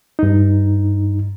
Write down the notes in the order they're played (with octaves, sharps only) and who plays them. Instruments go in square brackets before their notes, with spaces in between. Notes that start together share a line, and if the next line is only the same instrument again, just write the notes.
[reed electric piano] G2 D#4